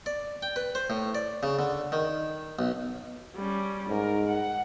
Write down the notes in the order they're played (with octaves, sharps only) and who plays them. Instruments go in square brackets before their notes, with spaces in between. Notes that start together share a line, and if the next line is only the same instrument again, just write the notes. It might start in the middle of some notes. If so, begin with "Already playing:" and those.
[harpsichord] D5
G5
B4
C5
A2
D5
C#3
D3
D#3
B1
[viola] G3 C#4
[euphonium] G#2 [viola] A#4
[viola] F#5